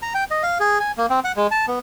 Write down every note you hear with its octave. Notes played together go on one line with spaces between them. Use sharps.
A#5
G5
D#5
F5
G#4
G#5
A#3
C4
F#5
G#3
A5
B3